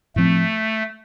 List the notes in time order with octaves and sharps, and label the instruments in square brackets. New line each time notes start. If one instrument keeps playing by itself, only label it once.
[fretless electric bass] A2 F3 C4 [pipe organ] A3